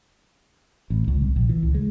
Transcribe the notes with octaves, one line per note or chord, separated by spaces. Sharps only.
A1
C#2
C2
A#1
E3
C#2
G#3